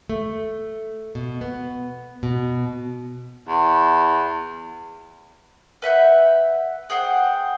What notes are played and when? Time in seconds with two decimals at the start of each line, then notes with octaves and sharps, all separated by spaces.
0.09 A3
1.15 B2
1.41 B3
2.23 B2
3.48 E2
5.82 B4 E5 F#5 G6
6.90 G#4 C5 F#5 G5